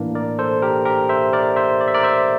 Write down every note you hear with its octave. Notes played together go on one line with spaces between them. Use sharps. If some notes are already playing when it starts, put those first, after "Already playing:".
Already playing: A2 E3 A#3 D4
A#4 D5
A4 C5
G4 A#4
G4 A#4
C5 E5
A#4 D5
C5 E5
D5
E5
A#4 D5
C5 E5